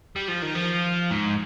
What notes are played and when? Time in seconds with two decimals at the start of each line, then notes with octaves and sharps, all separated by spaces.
0.16 G3
0.28 F3
0.43 D#3
0.55 F3
1.10 G#2